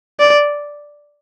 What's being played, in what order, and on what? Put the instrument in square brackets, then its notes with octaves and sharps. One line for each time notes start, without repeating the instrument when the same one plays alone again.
[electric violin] D5